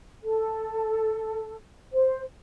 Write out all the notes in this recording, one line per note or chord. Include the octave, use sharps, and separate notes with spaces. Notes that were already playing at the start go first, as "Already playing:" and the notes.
A4
C5